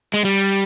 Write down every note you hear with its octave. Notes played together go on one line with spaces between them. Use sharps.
G#3
G3